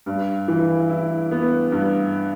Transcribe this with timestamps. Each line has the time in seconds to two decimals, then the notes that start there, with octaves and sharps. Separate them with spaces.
0.06 G2
0.48 E3
0.90 E4
1.31 B3
1.72 G2